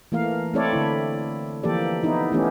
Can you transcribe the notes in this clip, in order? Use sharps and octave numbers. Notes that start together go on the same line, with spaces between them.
E3 A3 A#3 A#4 F5
A3 C4 E4 A4 C#5 D5
D3 E4
E3 F3 A#3 G4 A4 D5
B3 D#4 E4
E3 A3 B3 C#4 G4